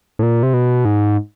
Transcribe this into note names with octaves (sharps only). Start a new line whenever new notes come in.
A2
A#2
C3
B2
G#2